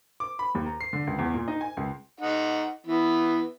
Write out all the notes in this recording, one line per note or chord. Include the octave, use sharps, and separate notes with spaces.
D6
B5
D#2
A#5
C7
D3
C#2
E2
A#2
D#4
G#5
C#2
D#4 F#5
E3 B3